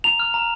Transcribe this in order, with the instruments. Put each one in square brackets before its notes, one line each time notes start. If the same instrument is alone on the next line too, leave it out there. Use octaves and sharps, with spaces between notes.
[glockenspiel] A#5 F7
F6
A#5